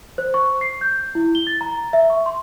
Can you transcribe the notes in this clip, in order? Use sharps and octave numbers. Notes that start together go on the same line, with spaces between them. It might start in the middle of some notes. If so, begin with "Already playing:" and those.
C5
C#6
C7
G6
E4
G7
A6
A#5
E5
C#6
C6